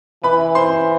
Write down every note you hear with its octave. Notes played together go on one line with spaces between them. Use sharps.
E3 B4 B5
C5 C6